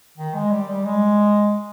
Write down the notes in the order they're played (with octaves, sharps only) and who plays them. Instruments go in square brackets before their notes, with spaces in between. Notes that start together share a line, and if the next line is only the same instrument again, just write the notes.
[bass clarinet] D#3
G#3
G3
G3
G#3